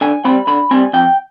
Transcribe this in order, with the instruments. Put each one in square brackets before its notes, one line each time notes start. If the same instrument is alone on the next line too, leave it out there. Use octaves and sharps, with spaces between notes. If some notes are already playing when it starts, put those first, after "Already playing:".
[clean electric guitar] D3 G#5
G3 C4 B5
D3 B5
G3 C4 G#5
F2 G5